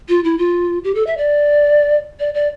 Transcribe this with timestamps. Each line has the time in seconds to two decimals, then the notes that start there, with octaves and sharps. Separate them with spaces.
0.09 F4
0.24 E4
0.38 F4
0.84 G4
0.95 A4
1.07 E5
1.17 D5
2.20 D5
2.34 D5